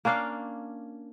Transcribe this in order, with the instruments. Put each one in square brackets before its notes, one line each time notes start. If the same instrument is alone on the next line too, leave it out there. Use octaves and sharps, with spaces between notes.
[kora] A#3 C#4 D4 F5